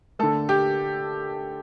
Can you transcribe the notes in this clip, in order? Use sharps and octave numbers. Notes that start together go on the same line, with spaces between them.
D3 A3 A4
G4